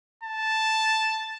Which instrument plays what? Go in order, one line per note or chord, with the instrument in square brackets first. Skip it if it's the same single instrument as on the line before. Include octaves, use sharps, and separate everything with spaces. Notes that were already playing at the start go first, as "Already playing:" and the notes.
[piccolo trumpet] A5